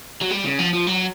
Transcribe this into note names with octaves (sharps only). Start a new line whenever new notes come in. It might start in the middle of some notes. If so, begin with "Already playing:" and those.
F#3
G3
C#3
F3
F3
F#3